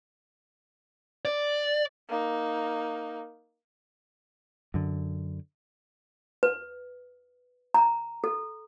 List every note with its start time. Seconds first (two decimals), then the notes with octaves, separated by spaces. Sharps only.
1.25 D5
2.09 A#3 D#4
4.74 F#2 D3
6.43 B4
7.74 A#5
8.24 A4